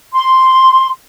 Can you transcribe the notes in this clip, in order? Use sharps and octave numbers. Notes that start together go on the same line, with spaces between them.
C6